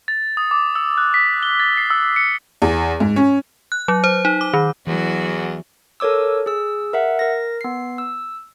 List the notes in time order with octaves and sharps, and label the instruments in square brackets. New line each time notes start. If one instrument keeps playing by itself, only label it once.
[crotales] A6
D#6
D6
E6
F#6
B6
G7
A6
C7
E6
C#7
[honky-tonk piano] E2
G#2
C#4
[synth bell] F#6
F#3
C5
D#4
D6
D#3
[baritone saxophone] E2 [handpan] E3 [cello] F#3 F#4
[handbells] A4 A#4 C#5 D6 E6
G#4 E6
A#4 E5 F#5
A#4 A#6
B3 C7
E6